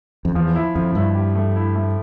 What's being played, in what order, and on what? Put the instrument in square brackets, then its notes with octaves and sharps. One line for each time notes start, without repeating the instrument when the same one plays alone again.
[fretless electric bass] F2
[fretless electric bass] E2 [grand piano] F3
[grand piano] E4
[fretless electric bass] F2 [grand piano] F3
[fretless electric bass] G2 [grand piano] E4
[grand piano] G4
A3
E4
A3